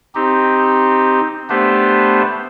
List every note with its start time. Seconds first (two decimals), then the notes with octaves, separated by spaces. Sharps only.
0.15 C4 D#4 G4
1.50 A3 B3 D4 G4 B4 C5